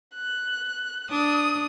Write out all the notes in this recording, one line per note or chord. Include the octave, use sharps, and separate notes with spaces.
F#6
D4 D#6